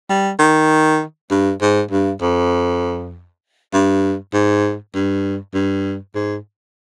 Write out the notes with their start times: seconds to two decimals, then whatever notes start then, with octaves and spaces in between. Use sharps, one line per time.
0.09 G3
0.39 D#3
1.31 G2
1.61 G#2
1.91 G2
2.22 F2
3.73 G2
4.33 G#2
4.95 G2
5.54 G2
6.15 G#2